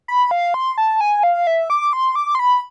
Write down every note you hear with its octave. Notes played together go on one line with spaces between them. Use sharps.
B5
F5
C6
A5
G#5
F5
E5
D6
C6
D6
C6
B5